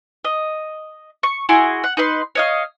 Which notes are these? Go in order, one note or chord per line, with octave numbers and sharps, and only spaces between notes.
D#5
C#6
E4 F#4 G#4 C6
F#5
D#4 B4 C6
C#5 D#5 F5